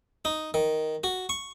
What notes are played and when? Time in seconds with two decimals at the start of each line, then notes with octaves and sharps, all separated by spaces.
0.25 D#4
0.54 D#3
1.04 F#4
1.29 C#6